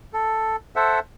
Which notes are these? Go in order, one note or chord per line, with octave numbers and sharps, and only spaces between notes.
A4
A4 C5 E5 F#5